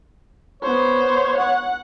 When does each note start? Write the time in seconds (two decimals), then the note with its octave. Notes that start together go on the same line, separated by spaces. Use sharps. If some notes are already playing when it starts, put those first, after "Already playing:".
0.63 B3 C5 C#5
1.37 F#5